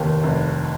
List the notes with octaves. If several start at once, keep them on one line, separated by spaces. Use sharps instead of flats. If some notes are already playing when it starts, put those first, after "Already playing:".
Already playing: F1 D#2 D#3
F1